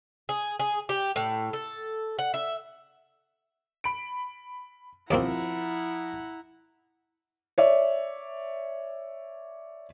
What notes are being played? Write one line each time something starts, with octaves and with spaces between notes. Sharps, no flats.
G#4
G#4
G4
A2
A4
F#5
E5
B5 D7
D#2 F3 A#3 C4 E4 F#5 A#5
C#5 D5 E5